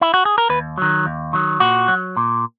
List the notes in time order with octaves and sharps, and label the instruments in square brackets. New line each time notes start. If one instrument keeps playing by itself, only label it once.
[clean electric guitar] E4
F#4
G#4
A#4
D#2 B4
D#3 F#3
D#2
D#3 F#3
A#2 F#4
F#3
A#2